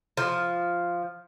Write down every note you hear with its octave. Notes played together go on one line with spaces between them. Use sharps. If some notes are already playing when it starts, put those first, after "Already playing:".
F3